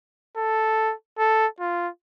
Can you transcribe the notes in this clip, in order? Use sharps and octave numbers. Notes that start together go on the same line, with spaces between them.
A4
A4
F4